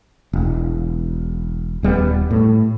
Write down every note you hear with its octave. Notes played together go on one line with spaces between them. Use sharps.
E1
D#1 G3 A3 B3
A2